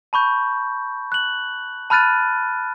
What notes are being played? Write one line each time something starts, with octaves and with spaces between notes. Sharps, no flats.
A5 B5 C#6 G6
F#6 F#7
A5 B5 F6 F#6 A6 D#7